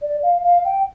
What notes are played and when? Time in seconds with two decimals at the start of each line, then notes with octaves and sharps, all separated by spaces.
0.02 D5
0.23 F5
0.44 F5
0.65 G5